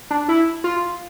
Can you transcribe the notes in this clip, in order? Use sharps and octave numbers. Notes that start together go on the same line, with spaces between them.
D4
E4
F4